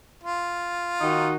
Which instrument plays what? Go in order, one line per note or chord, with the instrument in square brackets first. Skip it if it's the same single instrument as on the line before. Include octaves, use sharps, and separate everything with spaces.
[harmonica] F4
[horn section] D#3 D#4 F#4